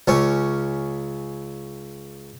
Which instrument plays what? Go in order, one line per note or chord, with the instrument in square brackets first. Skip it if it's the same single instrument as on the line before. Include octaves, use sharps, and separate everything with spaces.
[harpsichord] C#2 C#4